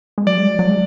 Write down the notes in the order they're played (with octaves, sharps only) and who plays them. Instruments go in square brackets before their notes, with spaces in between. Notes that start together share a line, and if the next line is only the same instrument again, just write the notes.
[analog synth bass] G#3
[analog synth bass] F#3 [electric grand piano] D5
[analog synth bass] G#3
F#3
F#3
G#3